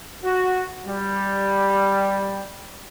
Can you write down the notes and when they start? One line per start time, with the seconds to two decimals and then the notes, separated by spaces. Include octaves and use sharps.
0.24 F#4
0.87 G3